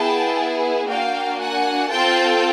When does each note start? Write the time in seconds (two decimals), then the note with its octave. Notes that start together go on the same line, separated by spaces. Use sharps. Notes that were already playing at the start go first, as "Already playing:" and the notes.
Already playing: B3 E4 G#4 G5 A5
0.87 A#3 D4 F#4 F5 G5
1.39 F#5 G#5
1.90 C4 F4 A4 G5 A5